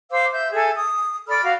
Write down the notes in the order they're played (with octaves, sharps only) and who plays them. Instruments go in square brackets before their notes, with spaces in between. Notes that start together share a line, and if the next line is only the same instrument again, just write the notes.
[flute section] C5 F5 D6 E6
E5 G6
G#4 A4 E5 G#5
D#6
A4 D5 B5 F6
F#4 F5